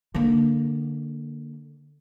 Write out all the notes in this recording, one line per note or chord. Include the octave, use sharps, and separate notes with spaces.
D3 A#3